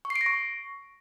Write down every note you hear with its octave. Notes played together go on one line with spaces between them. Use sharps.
C#6
C7
D7
A#6
C#6